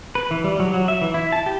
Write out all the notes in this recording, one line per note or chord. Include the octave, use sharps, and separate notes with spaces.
B4
E3
G3
F#3
F#3
E5
E3
E4
A5
G4